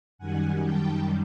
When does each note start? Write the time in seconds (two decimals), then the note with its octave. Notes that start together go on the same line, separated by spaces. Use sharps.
0.18 F#2 D#3 G3 F#5 G#5
0.63 G5 A5